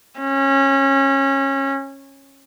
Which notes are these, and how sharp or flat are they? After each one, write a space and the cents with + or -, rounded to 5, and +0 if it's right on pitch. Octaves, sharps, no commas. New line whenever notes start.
C#4 -25